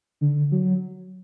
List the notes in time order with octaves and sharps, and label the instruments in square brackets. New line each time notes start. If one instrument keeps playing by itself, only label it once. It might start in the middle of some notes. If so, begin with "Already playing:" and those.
[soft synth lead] D3
F#3